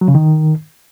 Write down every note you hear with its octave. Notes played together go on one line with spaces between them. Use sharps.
F#3
C#3
D#3